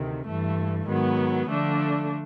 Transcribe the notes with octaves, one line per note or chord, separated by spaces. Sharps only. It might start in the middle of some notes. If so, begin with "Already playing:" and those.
Already playing: D2 C3 D#3
G2 E3 A3
G#2 D#3 F#3 B3
D3 F3 A3 D4